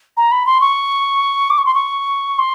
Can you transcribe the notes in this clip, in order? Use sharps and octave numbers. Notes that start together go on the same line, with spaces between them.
A#5
B5
C6
C#6
D6
C#6
C6
C#6
C6